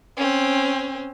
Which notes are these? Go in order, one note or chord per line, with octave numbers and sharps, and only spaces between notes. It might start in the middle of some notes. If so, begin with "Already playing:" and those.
C4 C#4